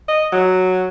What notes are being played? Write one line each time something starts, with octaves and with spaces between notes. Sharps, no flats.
D#5
F#3